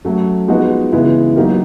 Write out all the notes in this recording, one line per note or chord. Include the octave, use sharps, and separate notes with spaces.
F#3 A3 C#4
F3 G#3 B3 D#4 F#4
C#3 E3 G#3 B3 E4
F#3 A#3 D#4 G4 A#4